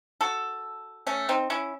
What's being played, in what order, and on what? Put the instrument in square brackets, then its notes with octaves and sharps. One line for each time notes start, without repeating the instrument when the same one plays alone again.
[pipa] F#4 A4
A3 C#4
C4 D#4
C#4 E4